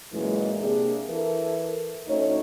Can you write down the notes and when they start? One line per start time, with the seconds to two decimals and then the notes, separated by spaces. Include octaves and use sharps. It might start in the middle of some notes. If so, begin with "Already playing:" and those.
0.13 F#2 A#2 E3 G#3
0.60 C3 A#3 D4 G4 G#4
1.10 E3 A4 A#4
2.08 D2 C#4 D#4 A4 C#5